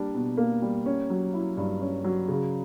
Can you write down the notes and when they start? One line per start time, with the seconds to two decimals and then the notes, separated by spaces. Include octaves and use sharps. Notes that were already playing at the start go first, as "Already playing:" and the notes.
Already playing: G3 A#3 D4
0.15 B2
0.37 A#3
0.62 G3
0.86 C#4
1.10 F#3
1.34 E4
1.57 G2
1.81 C#4
2.04 F#3
2.28 C#3